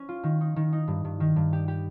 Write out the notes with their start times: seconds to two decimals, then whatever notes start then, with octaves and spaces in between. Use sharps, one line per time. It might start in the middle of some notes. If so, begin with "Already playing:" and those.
Already playing: C#4
0.09 F4
0.24 D#3
0.41 D#4
0.56 D#3
0.73 D#4
0.88 G2
1.05 G2
1.20 D#3
1.36 G2
1.53 G4
1.68 G4